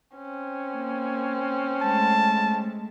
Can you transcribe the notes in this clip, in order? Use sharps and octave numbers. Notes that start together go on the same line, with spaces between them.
C4 C#4
A#3
G#3 A3 A5